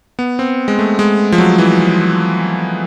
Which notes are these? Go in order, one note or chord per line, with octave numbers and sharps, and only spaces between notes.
B3
C4
G#3
A3
G#3
F3
F#3
E3